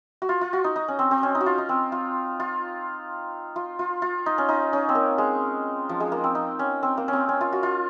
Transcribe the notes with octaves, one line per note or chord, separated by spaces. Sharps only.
F#4
F4
F4
F#4
D#4
D#4
C#4
C4
C4
C#4
D#4
F#4
F4
D#4
C4
F4
F4
F4
F4
F4
D#4
C#4
D#4
C#4
C4
A#3
G#3
F3
G#3
A#3
C4
D#4
C#4
C4
A#3
C4 C#4
C#4
F4
F#4
F4